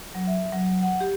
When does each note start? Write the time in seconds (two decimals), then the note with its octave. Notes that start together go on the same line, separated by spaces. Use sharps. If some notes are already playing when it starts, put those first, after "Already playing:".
0.15 F#3
0.27 E5
0.53 F#3
0.81 F#5
1.01 G4